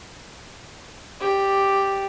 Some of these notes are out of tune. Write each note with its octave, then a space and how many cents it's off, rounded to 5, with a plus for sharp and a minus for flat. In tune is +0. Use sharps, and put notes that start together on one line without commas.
G4 +0 D5 +0